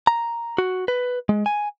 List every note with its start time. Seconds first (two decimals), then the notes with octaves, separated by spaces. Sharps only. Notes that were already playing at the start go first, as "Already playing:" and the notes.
0.07 A#5
0.58 F#4
0.88 B4
1.29 G#3
1.46 G#5